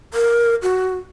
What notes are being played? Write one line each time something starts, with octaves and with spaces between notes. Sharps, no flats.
A#4
F#4